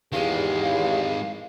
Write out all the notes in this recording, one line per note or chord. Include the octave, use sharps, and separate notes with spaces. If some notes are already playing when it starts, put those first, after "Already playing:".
E2 D#3 G#3 G4 F5